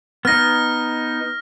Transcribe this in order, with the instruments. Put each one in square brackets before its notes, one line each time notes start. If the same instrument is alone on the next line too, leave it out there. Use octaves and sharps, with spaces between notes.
[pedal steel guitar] B3 D#4 [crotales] F6 A#6